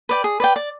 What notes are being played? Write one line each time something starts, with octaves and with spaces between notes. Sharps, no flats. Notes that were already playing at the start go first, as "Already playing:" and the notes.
B4 D5 G5
G#4
B4 D5 G5
D5